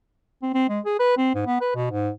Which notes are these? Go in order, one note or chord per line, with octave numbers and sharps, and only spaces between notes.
C4
C4
G#3
G#4
B4
C4
G#2
B3
B4
B2
G#2